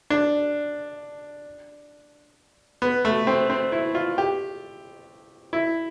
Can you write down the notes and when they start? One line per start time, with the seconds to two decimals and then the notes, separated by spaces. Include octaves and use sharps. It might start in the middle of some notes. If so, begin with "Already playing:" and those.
0.10 D4
2.82 B3
3.05 A3
3.27 C4
3.50 C4
3.72 E4
3.95 F4
4.18 G4
5.53 E4